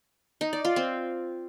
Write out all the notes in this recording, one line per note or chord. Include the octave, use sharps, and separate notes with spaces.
D#4
D5
F4
C4